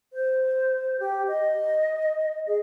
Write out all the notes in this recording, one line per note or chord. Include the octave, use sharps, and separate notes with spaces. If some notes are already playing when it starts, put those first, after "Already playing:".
C5
G4
D#5
G#4